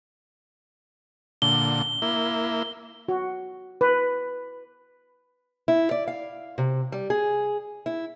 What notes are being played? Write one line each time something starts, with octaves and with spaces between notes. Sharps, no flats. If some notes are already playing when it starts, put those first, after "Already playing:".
A#2 D3 G7
A#3 E4
F#4
B4
E4
D5
F5
C3
G3
G#4
E4